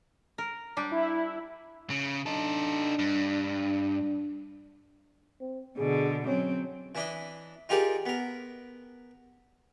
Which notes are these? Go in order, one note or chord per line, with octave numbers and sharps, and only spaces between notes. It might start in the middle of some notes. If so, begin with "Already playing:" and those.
A#4
G3 D4 G4
E4
C#3
D4 D#4 A4
G2
C4
B2 D3 G#4
F#3 C4 C#4
E3 D4 E4 D#5
D#4 F4 G4 G#4 A#4 D5
B3 A#4